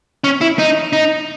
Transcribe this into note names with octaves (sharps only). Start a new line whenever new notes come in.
C#4
E4
D#4
D#4